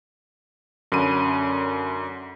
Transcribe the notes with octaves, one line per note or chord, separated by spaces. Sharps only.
F#2 D3 C#4 B5 D#7